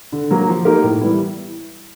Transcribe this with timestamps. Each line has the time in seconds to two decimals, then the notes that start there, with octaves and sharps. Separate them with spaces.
0.12 D3
0.31 F#3 A#3
0.48 F3
0.65 A#3 D#4 G4 A#4
0.83 A2
1.01 E3 G3 B3 E4